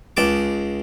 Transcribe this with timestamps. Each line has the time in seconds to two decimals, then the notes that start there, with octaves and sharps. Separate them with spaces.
0.17 C#2 G#3 A5 D6